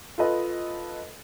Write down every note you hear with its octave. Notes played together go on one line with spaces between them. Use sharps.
F4 A4 B4 D#5